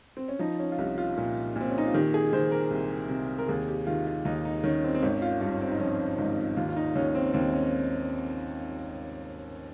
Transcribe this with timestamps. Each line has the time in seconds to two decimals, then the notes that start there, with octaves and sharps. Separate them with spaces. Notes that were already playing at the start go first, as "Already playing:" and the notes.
0.17 C4
0.28 C#4
0.39 F3 D#4
0.59 C#4
0.72 F4
0.78 C2 D#4
0.98 F4
1.17 A#2
1.56 A#2 C4
1.69 C#4
1.78 D#4
1.86 F4
1.94 D#3 G4
2.14 G#4
2.33 D#3 C5
2.51 A#4
2.71 C2
3.09 C3
3.38 A#4
3.48 D#2 G#4
3.68 G4
3.87 D#3 F4
4.07 F4
4.25 D#2 D#4
4.45 D#4
4.64 D#3 C#4
4.84 C4
4.95 C4
5.03 G#1 C#4
5.22 F4
5.41 G2 F4
5.51 C#4
5.61 C4
5.72 D#4
5.80 F3 C#4
6.18 G#1 D#4
6.57 D#2 F4
6.69 F4
6.77 D#4
6.95 D#2 C#4
7.15 C4
7.34 D#2 C4
7.53 C#4